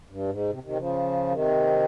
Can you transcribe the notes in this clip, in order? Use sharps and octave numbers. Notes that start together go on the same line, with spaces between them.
G2
G#2
C3
C3 D#3
C#3 F3
C3 D#3